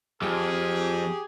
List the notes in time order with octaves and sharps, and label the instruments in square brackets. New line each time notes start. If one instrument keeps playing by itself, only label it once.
[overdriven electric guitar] F2 [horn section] G4 G#4